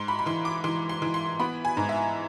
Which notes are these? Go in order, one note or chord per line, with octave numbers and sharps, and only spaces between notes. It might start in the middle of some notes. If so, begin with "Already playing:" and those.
Already playing: G#2 C6
B5
B5
E3 C6
D6
E3 C6
C6
E3
C6
B3 B5
G#5
G#2
E5